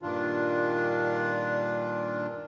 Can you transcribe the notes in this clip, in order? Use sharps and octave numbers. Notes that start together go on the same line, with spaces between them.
G2 A#2 D#3 D4 F4